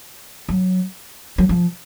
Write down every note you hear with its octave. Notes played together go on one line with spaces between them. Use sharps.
F#3
F#3
F3